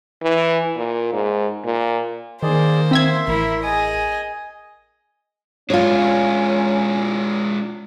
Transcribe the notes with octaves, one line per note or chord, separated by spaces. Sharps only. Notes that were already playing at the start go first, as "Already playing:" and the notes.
E3
A#2
G#2
A#2
D#3 A#3 G#4 C5 D5
C4 E5 C6 E6 G#6
A1 E4 A#4
G#4 D#5 G#5
G#3 C#4 D4 F4 C#5